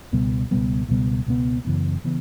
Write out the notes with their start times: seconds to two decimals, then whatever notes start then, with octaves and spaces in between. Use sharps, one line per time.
0.12 C#2 B2 G3 B3
0.51 C#2 B2 G3 B3
0.88 C#2 B2 G3 B3
1.26 C#2 B2 G3 B3
1.65 F#2 C#3 E3 B3
2.04 C#3 E3 B3